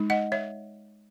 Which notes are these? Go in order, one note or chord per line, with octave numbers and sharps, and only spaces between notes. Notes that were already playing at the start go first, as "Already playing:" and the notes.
Already playing: G#3 D#4
D#5 F#5
C#5 E5